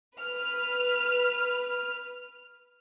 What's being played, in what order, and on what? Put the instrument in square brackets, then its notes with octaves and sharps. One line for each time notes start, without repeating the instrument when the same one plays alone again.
[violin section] B4 F6